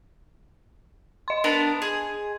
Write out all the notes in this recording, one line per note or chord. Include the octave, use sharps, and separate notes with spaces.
D#5 C6
B3 D4 A#4
G#4